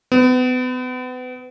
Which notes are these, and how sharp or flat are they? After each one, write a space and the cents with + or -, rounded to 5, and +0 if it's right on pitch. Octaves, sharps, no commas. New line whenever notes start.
B3 +35